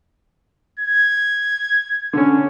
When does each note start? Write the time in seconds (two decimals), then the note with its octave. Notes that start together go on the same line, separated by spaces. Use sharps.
0.80 G#6
2.13 D3 C#4